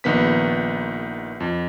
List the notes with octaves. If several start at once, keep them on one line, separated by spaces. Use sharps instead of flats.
A#1 D#3 B3 B6
F2